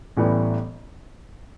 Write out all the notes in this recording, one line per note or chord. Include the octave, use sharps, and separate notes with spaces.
A1 A2 E3 G3 B3